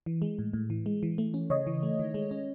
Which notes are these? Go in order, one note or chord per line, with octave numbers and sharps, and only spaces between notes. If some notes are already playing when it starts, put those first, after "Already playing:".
E3
G#3
A2
A2
E3
G#3
E3
A3
C#4
C#3 C#5 D#5
E3
A3
D#3
G#3
C#4